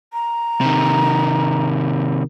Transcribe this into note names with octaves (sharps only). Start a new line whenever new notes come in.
A#5
C3 D#3